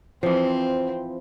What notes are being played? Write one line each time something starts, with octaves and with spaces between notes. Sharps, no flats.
E3 F3 C4